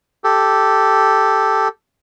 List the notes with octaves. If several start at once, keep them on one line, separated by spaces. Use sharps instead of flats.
G4 A4